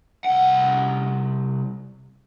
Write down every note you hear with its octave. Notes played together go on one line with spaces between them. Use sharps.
C2 F#5